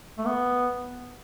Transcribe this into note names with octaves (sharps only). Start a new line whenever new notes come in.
A3
B3